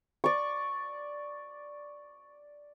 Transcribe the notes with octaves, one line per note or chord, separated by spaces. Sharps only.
D5 C#6